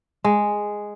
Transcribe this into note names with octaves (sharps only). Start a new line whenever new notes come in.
G#3